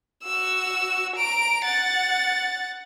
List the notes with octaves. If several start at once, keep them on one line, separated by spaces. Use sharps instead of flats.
F#4 E6
A#5 D7
F#5 A6